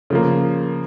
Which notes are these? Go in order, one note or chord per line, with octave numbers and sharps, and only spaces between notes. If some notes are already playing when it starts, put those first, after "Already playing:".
C#3 F3 A#3